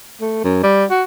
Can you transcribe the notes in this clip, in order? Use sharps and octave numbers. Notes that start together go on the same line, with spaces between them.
A3
F#2
G3
F#4